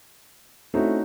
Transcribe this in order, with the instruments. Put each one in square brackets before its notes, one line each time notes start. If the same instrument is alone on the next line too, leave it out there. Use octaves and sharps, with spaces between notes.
[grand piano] A3 C4 E4 [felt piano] C#4 D#4 F#4